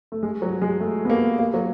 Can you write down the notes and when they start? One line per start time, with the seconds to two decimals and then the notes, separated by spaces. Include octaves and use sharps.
0.12 A3
0.23 G#3
0.42 F#3
0.62 G#3
0.80 A3
1.05 B3
1.10 A#3
1.39 A#3
1.54 F#3